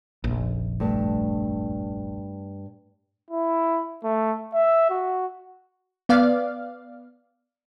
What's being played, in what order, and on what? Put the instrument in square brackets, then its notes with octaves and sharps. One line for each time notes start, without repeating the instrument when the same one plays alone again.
[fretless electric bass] F1 A#1
[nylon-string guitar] G2 A3
[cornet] E4
A3
E5
F#4
[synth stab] B3 D5 F5